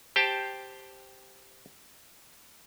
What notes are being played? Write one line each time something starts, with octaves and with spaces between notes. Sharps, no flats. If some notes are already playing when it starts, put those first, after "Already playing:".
G4 C5 G5 A5